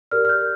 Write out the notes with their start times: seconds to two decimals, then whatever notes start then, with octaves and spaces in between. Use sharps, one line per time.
0.11 G4 A#4 D5 F6
0.25 F6
0.29 G6